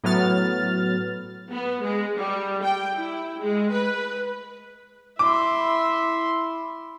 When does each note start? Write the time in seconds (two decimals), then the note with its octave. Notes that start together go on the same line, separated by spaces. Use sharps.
0.04 A2 F#3 B3 F6 A6
1.52 B3
1.84 G#3
2.18 G3
2.64 G5
2.96 E4
3.41 G#3
3.72 B4
5.19 E4 E5 C6 D6